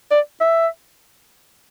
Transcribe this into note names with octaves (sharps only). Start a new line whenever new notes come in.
D5
E5